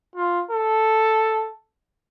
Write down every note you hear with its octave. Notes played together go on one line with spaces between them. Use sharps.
F4
A4